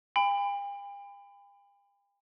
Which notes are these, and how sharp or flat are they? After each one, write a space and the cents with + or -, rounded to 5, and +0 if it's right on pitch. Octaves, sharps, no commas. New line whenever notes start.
G5 +45 B5 +30